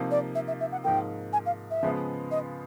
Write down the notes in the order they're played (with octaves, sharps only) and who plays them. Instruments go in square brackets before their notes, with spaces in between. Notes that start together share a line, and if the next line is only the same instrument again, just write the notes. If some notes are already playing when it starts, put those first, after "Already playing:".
Already playing: [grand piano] C3 F3 A#3 D#4
[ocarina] D5
E5
E5
E5
F#5
[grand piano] G#2 F3 A#3 [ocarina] G5
[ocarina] G#5
F5
E5
[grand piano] C#3 F3 G#3 B3
[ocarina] D#5